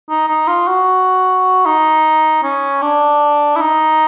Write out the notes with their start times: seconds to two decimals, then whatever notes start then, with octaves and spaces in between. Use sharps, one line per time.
0.09 D#4
0.28 D#4
0.48 F4
0.67 F#4
1.66 D#4
2.43 C#4
2.82 D4
3.56 E4
3.61 D#4